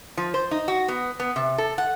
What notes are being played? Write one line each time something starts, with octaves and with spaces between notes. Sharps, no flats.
F3
C5
D#4
F#4
B3
B3
C3
A4
F#5